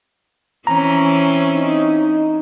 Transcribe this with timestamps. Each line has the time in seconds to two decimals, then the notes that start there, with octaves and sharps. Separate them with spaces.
0.67 E3 C4 C#4 A#5
1.54 D#4